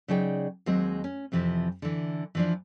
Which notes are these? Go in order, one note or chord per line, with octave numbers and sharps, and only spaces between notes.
C#3 F#3 D#4 G#4 D5 G5
D#2 F#3 G#3 C4 G#4 D#5
C#4
F2 C3 E3 F3
D3 E3
E3 F3 D4